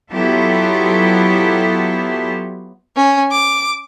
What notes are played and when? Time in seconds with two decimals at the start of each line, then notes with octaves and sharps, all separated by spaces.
0.11 F#3 B3 E4 F4 G4 A4
2.96 C#4
3.31 D6